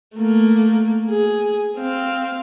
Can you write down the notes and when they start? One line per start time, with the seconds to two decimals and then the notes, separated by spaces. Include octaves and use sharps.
0.17 A3 A#3
1.10 G#4
1.78 C4 F5